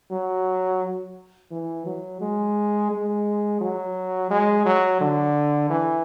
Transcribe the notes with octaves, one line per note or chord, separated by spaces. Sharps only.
F#3
E3
F#3
G#3
G#3
F#3
G#3
F#3
D3
E3